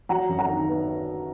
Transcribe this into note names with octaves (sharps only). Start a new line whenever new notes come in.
F#3 F#5 A#5
F#2
F#5 A#5
D#3
B3